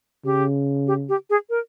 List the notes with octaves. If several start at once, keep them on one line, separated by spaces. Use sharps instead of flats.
C#3 G4
G4
G4
G#4
A#4